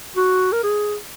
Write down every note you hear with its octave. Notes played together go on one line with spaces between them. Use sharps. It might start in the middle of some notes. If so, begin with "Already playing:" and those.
F#4
A#4
G#4